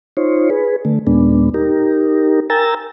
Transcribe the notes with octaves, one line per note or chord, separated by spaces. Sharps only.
D#4 F4 C5 C#5
G#4 B4
D3 A3
D#2 A#2 G#3 B3 D4
D#4 G4 A#4
A#4 G5 G#5 A#5 E6 A6